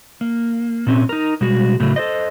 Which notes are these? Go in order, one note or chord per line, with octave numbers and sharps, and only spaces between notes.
A#3
A#2 C4 C#4
D#4 A#4
B2 G3 G#3 F#4 G#4
A2 C#3 F#3 A3
A4 C5 D#5